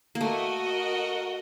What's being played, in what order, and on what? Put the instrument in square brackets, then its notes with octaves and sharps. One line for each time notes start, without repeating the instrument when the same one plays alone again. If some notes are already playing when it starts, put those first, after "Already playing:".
[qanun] A#3
[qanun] A3 [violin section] F#4 A#4 D#5